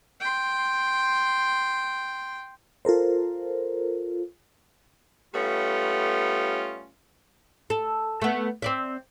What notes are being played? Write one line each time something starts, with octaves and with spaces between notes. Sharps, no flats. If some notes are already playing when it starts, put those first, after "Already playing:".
G5 C6
F4 A4 A#4 C5
G3 A3 B3 C#4 F4
A4
A3 B3
C4 D5 E5